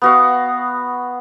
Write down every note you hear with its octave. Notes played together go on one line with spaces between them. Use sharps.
B3 F#4 F5